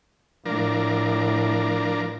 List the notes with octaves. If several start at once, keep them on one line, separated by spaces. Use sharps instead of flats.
A2 F3 D4 A#4